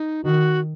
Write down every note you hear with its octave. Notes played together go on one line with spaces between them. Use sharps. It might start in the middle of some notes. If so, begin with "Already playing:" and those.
Already playing: D#4
D#3 F#4